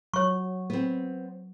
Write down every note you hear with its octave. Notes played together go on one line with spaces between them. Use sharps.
F#3 C#5 C#6
B3 C4